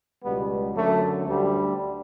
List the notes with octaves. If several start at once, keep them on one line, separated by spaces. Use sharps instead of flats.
C#2 B2 G3 B3
F#2 D3 F#3 A3
D2 D3 G3